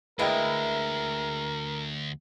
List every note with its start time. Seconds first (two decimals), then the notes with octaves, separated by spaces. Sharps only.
0.19 D2 G#3 A#3 E4 A#4 B4 D#5 G5